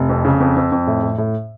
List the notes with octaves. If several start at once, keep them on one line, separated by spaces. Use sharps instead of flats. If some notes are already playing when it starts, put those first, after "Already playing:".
Already playing: F1
F2
C#3
F2
F2
F2
A2
A2
A2